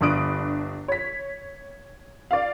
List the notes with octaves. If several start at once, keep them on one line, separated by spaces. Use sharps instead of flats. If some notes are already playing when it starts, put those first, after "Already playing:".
G1 G2 D4 D#6 F#6 D7
C#5 B6
D5 F5